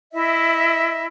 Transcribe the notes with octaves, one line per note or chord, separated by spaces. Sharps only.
E4 D#5 E5